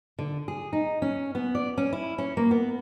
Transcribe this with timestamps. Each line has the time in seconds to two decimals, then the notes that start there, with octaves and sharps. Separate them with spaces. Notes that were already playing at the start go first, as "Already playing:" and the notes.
0.19 D3
0.48 G#4
0.73 D#4
1.02 C#4
1.35 B3
1.55 D5
1.78 C#4
1.93 E4
2.18 C#4
2.37 A#3
2.51 B3